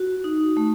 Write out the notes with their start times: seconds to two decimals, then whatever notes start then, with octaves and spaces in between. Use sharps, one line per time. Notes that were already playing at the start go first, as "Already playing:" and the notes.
Already playing: F#4
0.24 D#4
0.57 A3